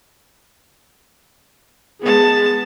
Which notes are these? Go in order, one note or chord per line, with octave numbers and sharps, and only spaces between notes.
G#3 B3 G#4 A5